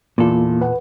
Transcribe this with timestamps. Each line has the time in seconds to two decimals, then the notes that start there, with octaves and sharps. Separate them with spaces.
0.18 E2 A#2 A#3 F4 A4
0.61 B4 F#5